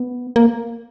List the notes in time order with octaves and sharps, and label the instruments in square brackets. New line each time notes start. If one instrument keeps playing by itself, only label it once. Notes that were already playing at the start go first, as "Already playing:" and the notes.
Already playing: [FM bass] B3
A#3